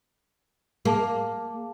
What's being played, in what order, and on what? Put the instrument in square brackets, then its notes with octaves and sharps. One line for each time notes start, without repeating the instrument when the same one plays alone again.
[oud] A#3 [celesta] G#4 A5 D6